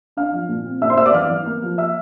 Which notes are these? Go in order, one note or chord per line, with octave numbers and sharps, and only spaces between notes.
D4 F5 F6
F3
A#2
C4
A#2 E5 E6
C5 C6
A#3 E5 E6
D5 D6
E3 F5 F6
E3
A#3
F3
A#3 E5 E6